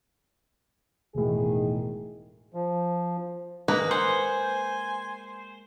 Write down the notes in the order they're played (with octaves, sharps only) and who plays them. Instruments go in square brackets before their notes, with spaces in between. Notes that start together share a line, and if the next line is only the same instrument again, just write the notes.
[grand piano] E1 A2 [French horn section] D#3 G#4
[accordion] F3
[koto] G#3 A#3 [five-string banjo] B4 [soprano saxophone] A#5
[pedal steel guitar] C5 [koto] F#5 [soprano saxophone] G#5